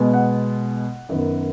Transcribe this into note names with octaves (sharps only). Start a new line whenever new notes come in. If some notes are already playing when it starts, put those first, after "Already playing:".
Already playing: B2 G#3 B3
F#5
F#2 D#3 B3